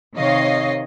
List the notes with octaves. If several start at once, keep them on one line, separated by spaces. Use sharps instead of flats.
C3 D#3 C#5 D#5 F5 C7